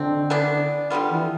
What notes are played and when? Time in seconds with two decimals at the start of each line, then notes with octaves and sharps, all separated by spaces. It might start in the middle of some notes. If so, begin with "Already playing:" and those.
Already playing: B2 D3 C4
0.30 E3 B3 D4
0.90 D3 G3 B3 F4
1.10 E3